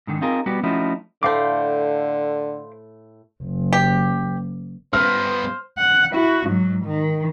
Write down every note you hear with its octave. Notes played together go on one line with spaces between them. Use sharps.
G#2 D3 D#3
C4 D#4 F4 G#4 A#4
G3 B3 F#4 G4
F3 A3 C#4 D#4 E4 F#4
A2 D3 A3 C5 F5 D6
F#1
G4
G2 B3 C5 F6
F#5
E4 F#4
G#2 F#3
D#3